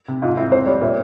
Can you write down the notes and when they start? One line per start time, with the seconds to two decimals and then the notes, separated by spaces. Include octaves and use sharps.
0.08 C3
0.22 G#2 F4
0.37 C4 E4
0.51 F2 C5
0.66 G3 C#5
0.81 A#2 E5